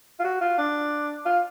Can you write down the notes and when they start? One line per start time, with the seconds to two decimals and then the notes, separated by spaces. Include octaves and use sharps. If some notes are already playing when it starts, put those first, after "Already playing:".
0.19 F4
0.24 F#4
0.41 F4
0.58 D4
1.25 F4